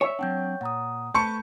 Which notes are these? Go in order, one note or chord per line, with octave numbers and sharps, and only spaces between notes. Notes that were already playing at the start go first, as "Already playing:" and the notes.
C#5 E5 G5
F#3 C4 D4 F#5 G5 G6
A#2 F#5 A#5 D#6
A3 B4 A5 C#6 G6 C#7